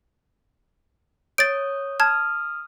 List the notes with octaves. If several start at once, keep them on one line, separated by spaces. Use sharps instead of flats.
C#5 D#6 G6 A6 D7
A5 D#6 F6 G#6